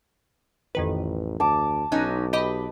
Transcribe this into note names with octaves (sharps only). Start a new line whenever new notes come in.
A1 F2 D#3 B4
D2 A5 D6
B1 F#3 C#4 D#4 F#6
G4 B4 D#5 D6